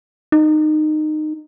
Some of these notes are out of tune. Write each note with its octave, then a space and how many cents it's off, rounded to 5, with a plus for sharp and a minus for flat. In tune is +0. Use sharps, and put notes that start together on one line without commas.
D#4 -20